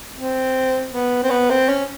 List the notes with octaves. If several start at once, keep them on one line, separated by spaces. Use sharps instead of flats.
C4
B3
C4
B3
C4
C#4